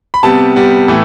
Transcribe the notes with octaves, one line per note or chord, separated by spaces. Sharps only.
B5
C3 G3 B3 A5
C3 G3 B3
A2 E3 A3